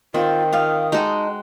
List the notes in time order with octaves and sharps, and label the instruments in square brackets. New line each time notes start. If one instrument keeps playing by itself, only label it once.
[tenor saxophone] D#3 [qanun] C4 [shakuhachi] F4
[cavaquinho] F4 F5 [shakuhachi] D#6
[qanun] G#3 F#4 [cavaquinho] D#4 A4 G5